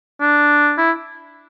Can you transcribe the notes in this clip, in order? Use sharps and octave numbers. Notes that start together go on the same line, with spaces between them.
D4
E4